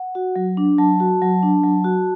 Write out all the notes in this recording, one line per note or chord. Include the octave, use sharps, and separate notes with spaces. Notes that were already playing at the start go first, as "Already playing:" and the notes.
Already playing: F#5
F#4
F#3
D4
F#3 A5
F#4
F#3
D4
F#3
F#4